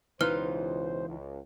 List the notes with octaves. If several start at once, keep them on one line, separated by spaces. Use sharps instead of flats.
C#2 B2 E3 D#4 F4 B4 C5 F6
C#2